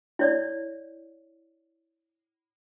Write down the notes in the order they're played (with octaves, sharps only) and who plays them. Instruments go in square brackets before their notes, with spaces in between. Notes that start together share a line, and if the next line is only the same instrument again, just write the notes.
[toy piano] E4 C#5 D5